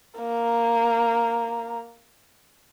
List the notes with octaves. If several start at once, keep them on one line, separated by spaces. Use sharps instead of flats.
A#3 A#5